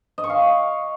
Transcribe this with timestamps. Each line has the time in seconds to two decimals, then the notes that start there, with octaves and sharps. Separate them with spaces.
0.18 D#5
0.24 C#6
0.30 F5